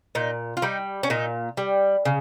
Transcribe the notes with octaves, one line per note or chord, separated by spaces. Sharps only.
A#2 D#4
F4
G3 D#4
C#4
A#2 D#4
G3
C#3